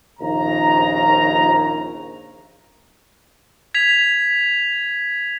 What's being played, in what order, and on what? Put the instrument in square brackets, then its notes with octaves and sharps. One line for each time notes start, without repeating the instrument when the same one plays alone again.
[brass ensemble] A#1 D#2 C#3 A#5
[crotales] G#6 B6 F7